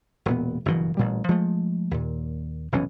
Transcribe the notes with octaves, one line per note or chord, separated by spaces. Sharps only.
E1 A#2 B3
F#1 G2 B2 E3
A1 A#2 G3
F3 G#3 A3
D#2 A#2
F1 B1 E3 C#4